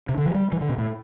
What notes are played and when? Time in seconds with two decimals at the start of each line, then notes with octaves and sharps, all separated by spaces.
0.09 C3
0.18 D3
0.26 F3
0.35 G3
0.52 E3
0.61 D3
0.69 B2
0.78 A2